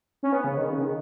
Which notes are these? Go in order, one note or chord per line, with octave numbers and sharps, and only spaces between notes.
C#4
B3
C#3
D#3
C#3
D#3